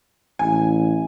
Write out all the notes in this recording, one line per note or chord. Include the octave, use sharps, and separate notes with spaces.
A1 G#5